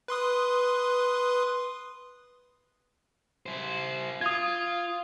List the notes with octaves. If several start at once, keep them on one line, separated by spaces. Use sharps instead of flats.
B4 C6 D#6
E4 C5
F4 D#6 G#6